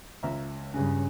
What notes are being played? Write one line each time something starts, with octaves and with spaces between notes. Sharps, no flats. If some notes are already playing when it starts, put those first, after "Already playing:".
C#2 E5 A#5
G2 C#3 C#4